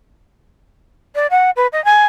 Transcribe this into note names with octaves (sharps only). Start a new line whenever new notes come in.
D5
F#5
B4
D#5
G#5